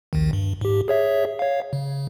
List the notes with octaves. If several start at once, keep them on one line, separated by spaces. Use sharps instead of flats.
A#1 D#2 D#3
G2
G#2 G4
G#4 C#5 E5
C#5 F5
C#3